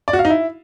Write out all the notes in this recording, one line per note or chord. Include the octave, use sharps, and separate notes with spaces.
D5
F#4
F5
D#4
E4